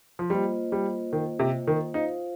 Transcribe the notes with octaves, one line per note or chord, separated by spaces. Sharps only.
F3
G3 A#3 F4 C5 D#5
G3
D#3
C3
D#3
D#4 F4 C5 F5